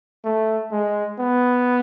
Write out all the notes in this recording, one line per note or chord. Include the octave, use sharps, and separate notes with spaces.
A3
G#3
B3